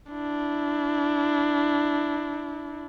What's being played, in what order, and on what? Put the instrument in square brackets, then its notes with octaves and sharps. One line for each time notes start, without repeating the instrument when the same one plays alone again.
[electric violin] D4 E4